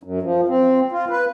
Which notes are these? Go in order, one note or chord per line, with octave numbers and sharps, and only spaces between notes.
F#2
F3
C4
F4
B4